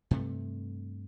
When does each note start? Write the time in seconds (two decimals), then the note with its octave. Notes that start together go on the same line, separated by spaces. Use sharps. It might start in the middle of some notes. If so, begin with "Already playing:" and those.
0.11 G2 C3 A3